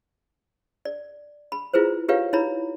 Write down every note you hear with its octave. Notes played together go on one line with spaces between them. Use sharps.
D5
B5
E4 F4 G#4 B4 C5
F4 G4 B4 C#5 F5
D#4 E4 C#5 A#5 B5